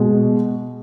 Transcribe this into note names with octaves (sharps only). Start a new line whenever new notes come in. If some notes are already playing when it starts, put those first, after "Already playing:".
Already playing: B2 G#3